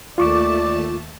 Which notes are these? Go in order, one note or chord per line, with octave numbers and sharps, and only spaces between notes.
D#2 A3 F4 D5 A5 C#6 D6